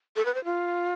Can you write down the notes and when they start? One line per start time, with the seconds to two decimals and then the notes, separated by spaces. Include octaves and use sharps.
0.16 A4
0.25 B4
0.35 C5
0.45 F4